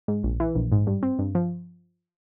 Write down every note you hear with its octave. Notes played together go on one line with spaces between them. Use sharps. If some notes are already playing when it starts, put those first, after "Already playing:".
G#2
A#1
E3
A#1
G#2
G2
C4
G2
F3